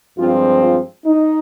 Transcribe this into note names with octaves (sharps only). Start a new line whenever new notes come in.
G2 F3 G#3 C4 F4
F4
D#4